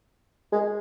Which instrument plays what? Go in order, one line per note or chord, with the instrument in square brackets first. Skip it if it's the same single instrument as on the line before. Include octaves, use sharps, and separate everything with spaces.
[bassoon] G#3